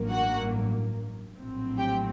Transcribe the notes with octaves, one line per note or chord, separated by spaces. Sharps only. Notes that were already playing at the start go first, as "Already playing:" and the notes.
Already playing: A1 G2 F#3 A#3
F#4 F#5
A#1 A2 F#3 C4
G4 G5